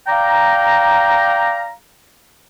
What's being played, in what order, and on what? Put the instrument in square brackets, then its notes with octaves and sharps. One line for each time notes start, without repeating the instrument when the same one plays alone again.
[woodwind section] D5 F5 G5 A#5